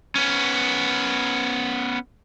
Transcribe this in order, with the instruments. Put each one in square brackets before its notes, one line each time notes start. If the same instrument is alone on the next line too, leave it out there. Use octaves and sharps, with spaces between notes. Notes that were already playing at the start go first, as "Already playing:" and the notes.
[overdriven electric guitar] B3 C#4